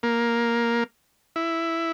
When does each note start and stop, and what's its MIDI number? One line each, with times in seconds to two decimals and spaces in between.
0.03 0.84 58
1.36 1.92 64